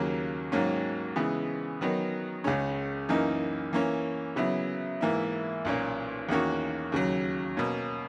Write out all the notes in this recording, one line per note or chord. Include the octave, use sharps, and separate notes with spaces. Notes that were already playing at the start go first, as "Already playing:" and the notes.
Already playing: D#2 C#3 F#3 A#3
G#2 D#3 F#3 A#3 C#4
C#3 E3 G#3 B3
D#3 F#3 B3 D#4 A#4
C#2 C#3 G#3 C#4
F#2 E3 A#3 D#4
E3 A#3 C#4
C#3 F#3 B3 E4
G#2 E3 A#3 E4
B1 A#2 A#3 C#4
E2 D#3 A#3 C#4 F#4
D#2 C#3 F#3
B2 A#3 C#4